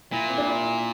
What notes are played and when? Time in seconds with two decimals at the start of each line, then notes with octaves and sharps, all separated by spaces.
0.12 A#2 E4
0.29 C4
0.38 D4
0.46 E4